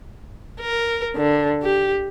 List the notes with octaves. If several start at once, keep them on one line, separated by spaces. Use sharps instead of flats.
A#4
D3
G4